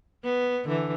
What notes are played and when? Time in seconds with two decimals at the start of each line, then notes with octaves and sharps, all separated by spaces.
0.23 B3
0.65 D3 E3